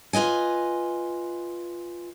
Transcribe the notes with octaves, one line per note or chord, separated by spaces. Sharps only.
F4 B4 D#5 G#5